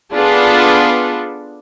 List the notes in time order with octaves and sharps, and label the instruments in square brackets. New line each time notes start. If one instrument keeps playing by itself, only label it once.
[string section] B3 D4 F4 G#4 A4 B4